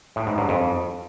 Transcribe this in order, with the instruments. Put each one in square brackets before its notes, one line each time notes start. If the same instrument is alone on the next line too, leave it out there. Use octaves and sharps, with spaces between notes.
[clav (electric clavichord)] A2
G#2
G2
F2